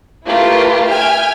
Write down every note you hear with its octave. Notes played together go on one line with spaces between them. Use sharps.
A3 E4 F4 G4 A#4 B4
E5 G5 G#5 F6 G#6